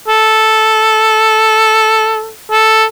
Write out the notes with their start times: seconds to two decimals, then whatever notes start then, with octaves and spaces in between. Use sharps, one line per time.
0.08 A4
2.52 A4